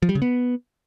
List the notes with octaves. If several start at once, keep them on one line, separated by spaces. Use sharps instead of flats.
F3
G3
C#3
B3